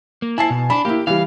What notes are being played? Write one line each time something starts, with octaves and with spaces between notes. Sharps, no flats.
A#3
E4 G#5 A5 C7
B2
D4 B5
A#3 E4 G4
E3 G3 F5